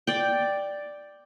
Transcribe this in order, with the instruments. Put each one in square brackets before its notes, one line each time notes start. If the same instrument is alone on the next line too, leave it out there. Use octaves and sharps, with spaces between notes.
[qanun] D5 G5